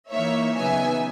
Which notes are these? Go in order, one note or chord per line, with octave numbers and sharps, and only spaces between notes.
E3 A#3 D#4 C#5 E5
C#3 F#3 B3 D#4 E5 G#5